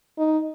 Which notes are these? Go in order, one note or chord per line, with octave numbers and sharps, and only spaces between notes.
D#4